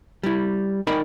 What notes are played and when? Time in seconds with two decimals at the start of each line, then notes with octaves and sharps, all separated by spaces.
0.23 G3 E4
0.87 D#4 A#4 D5 G5 B5